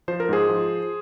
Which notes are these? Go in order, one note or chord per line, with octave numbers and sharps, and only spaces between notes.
F3 C5
A#4
G#2 G#4 C5
F3